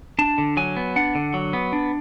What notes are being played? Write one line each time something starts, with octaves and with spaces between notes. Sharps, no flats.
D4 A5
D3
F#3 G#5
B3
D4 F#5
D3
F#3
B3
D4